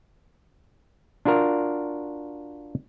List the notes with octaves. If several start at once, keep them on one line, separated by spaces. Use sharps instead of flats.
D4 F4 F#4 A#4